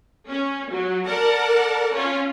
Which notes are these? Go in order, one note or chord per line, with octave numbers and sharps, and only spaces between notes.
C#4
F#3
A#4 D5 F#5 A5
C#4 F4